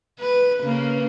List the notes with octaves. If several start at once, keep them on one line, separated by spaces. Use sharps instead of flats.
B4
C#3 A#3